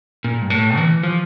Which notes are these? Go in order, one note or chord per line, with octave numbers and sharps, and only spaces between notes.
A#2
G2
A2
E3
F3